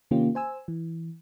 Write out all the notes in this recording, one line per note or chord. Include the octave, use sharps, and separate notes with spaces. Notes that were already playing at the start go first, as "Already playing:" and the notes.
C3 D#3 A#3 C#4 F4 G4
C5 G#5 E6
E3